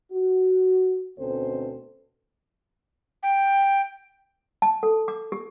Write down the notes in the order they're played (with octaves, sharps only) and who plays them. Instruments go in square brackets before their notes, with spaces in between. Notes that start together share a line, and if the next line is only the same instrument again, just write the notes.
[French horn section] F#4
D2 B2 C4 C#4 A4 C5
[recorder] G5
[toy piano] A5
A4
D6
G4